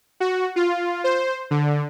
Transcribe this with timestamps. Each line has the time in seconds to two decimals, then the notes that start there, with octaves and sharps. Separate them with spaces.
0.20 F#4
0.56 F4
1.04 C5
1.51 D3